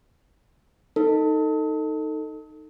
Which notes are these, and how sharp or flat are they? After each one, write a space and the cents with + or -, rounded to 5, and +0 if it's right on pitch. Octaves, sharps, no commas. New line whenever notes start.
D#4 +0 A4 +20